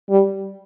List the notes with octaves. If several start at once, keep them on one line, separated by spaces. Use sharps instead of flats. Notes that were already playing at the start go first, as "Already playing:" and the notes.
G3